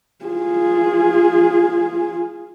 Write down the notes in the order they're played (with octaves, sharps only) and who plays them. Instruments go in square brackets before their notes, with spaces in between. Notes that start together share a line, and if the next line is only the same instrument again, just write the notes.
[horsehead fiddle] F4 G#4